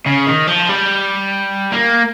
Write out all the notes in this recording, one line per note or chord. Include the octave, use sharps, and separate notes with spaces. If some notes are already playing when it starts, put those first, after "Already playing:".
C#3
D#3
F3
G3
A#3